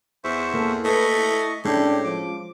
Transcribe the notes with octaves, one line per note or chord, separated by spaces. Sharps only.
E2 C5 E5 C#6
A#3 A4
A3 B4 D#5 C#6
E4
A2 G#3 C#4 D4 G4
F3 D6